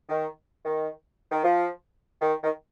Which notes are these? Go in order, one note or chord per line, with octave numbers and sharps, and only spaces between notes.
D#3
D#3
D#3
F3
D#3
D#3